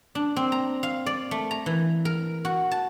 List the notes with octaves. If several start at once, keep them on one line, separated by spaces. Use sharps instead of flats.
D4
C4
A#5
F5
D5
A3
A#5
E3
A#4
F#4
A5